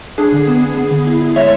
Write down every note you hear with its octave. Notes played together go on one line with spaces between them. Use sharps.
D4 G#4
D3
B3
B3
B3
D3
E4
E4
G#3 C#5 E5